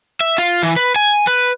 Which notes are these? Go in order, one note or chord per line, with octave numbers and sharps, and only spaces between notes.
E5
F4
E3
B4
G#5
B4